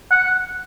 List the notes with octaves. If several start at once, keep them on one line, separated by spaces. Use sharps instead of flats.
F#5